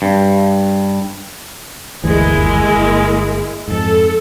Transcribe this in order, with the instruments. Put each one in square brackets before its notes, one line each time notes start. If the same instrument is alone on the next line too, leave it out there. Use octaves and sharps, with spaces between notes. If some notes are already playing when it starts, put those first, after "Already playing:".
[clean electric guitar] G2
[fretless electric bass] G1 D2 E3 [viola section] G#3 A#3 E4
[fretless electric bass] G1 D#2 E3
G1
[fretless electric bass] F2 G#2 [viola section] A4